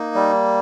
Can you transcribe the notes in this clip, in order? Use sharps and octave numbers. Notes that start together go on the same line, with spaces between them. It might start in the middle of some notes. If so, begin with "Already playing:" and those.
Already playing: A#3 D#4
G3